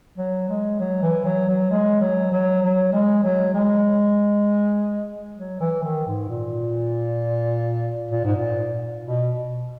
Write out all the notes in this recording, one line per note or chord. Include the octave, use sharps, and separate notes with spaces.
F#3
G#3
F#3
E3
F#3
F#3
G#3
F#3
F#3
F#3
G#3
F#3
G#3
F#3
E3
D#3
G#2
A#2
A#2
G#2
A#2
B2